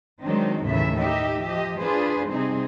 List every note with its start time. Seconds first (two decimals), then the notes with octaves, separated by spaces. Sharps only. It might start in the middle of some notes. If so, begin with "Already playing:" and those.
0.23 D#3 F#3 G#3 C4 D4 D#4
0.66 D#2 A2 C#3 E3 G#3 E5
0.99 D#4 G4 D#5 E5
1.44 F3 G4 D#5
1.79 D4 F4 G#4 B4 C5
2.30 C3 G3 C4 D#4 G#4